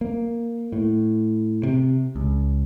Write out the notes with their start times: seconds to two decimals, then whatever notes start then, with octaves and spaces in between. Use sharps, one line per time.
0.01 A#3
0.73 A2
1.63 C3
2.16 C#2